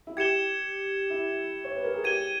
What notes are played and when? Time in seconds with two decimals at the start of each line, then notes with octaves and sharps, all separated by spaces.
0.07 E4
0.17 G4 G#6 C#7 E7 G7
1.10 E4
1.65 C#5
1.75 B4
1.84 A#4
1.94 G#4
2.04 G4 G#6 D#7 G7